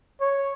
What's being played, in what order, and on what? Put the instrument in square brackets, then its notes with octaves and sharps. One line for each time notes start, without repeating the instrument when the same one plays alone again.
[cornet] C#5